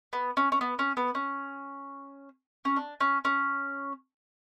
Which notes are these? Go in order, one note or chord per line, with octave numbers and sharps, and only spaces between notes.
B3
C#4
C#4
B3
C#4
B3
C#4
C#4
D4
C#4
C#4